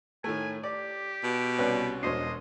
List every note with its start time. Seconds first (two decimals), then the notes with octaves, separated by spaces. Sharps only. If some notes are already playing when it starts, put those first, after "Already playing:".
0.24 A2 D#3 A3 G#5
0.63 G4 D5
1.24 B2
1.59 C2 C#4 B4 D5
2.03 E1 B2 D4 C5 C#5 D#5 C7